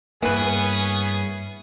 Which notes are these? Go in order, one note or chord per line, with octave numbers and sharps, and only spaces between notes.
G2 E3 A#3 B3 C#4 G#4 B4